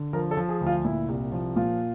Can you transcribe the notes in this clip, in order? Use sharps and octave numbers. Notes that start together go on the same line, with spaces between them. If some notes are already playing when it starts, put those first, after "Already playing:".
Already playing: D3
F3 A#4
A4
F3
G#4
D2
F4
A#2 E4
C2
F3
A#2 F4